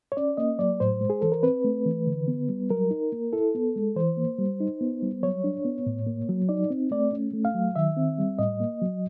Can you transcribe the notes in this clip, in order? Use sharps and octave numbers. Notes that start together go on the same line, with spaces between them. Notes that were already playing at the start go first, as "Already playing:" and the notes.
C#5
C#4 D5
A#3 D#5
F#3 D5
A2 C5
G#3
G#4
E3 A4
A#4
C4 B4
A3
E3
D3
B3
G3
F#3 A#4
D#4
A#3
E4 A4
B3
G#3
E3 C5
A#3
G3
D#4
B3
G3
F#3 C#5
D4
B3
A2
A#3
F#3
D#4 D5
C4
A3 D5
C#4
A3
F5
F#3
D#3 E5
C4
G3
A2 D#5
A#3
F#3